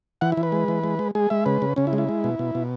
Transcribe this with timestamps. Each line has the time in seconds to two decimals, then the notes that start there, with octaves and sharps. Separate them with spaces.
0.21 E3 F#5
0.32 E4
0.37 E3
0.43 B4
0.52 G#3
0.68 E3
0.84 G#3
0.99 G#3
1.15 G#3 G#4
1.30 G#3 E5
1.46 C#3 B4
1.62 C#3
1.76 C#3 C#4
1.87 E4
1.93 G#3
1.98 E4
2.09 G#3
2.24 B2
2.39 B2
2.55 B2